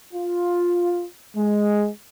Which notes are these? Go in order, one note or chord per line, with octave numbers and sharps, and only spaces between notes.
F4
G#3